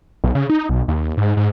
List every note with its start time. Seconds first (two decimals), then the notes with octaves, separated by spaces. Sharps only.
0.24 B1
0.35 C#3
0.50 D#4
0.69 B1
0.88 D#2
1.05 D#2
1.17 G#2
1.37 G#2